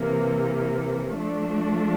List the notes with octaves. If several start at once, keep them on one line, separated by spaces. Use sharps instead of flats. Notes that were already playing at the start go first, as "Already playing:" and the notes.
Already playing: C3 E3 A#3
F3 A3 D4